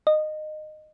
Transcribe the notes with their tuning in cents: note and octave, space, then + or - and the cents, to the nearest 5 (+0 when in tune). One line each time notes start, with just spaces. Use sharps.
D#5 -20